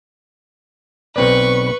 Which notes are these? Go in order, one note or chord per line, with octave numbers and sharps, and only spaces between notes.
B1 C4 B4 D5 C#6